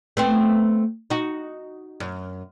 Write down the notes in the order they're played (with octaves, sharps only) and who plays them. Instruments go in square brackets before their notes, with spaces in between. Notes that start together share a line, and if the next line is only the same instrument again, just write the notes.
[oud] A3 B3 C4
D#4 F#4
F#2